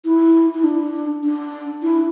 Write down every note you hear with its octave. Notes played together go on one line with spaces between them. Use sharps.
E4
E4
D4
D4
E4